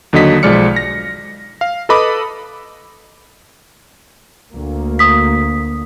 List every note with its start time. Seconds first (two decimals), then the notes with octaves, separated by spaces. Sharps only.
0.13 D#2 D3 F#3 D#5 B6
0.43 B1 F3 G#3 D5 F6 C#7
0.76 A#6
1.61 F5
1.89 A4 B4 D#5 B5 D6 D#6
4.53 D2 A#3
4.99 D#6 B6